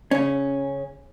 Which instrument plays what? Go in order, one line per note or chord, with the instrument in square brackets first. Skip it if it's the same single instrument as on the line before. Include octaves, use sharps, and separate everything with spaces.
[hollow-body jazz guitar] C#3 C#4